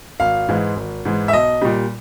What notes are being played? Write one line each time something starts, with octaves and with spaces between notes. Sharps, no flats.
G#1 F5
G#2 E3 G#3
G#1
G#2 E3 G#3
E5
B1 D#5
A#2 G3